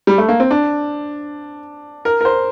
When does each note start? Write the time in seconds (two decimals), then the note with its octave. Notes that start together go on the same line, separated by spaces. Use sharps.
0.07 G3
0.18 A3
0.29 A#3
0.40 C4
0.51 D4
2.05 A#4
2.21 A#4
2.25 C5